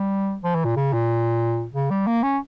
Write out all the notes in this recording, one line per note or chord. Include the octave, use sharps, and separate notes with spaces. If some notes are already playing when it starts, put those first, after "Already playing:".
Already playing: G3
F3
E3
A#2
C#3
A#2
C#3
G3
A#3
C#4